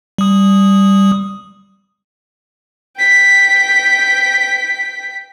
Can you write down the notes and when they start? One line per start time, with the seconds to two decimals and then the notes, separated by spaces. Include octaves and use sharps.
0.18 G3 D#6
2.97 G5 B6